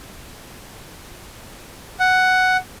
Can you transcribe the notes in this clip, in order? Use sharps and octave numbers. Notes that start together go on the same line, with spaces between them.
F#5